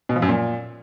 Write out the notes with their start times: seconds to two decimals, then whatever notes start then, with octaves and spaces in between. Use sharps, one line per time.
0.09 B2
0.16 F3
0.22 F#2
0.29 A#2